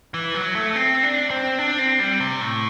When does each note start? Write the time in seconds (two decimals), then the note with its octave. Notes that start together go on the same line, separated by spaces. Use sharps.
0.14 E3
0.34 F#3
0.55 A3
0.76 C4
1.03 D4
1.30 C4
1.58 D4
1.79 C4
1.99 G3
2.20 C3
2.41 A2